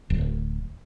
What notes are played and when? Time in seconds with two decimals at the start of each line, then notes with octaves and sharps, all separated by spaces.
0.10 D1